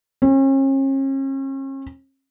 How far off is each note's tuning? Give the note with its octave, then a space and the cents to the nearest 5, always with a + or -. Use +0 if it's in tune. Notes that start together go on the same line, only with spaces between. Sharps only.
C#4 -40